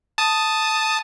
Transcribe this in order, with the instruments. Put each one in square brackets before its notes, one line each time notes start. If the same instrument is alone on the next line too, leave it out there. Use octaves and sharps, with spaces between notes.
[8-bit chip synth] A5 D#6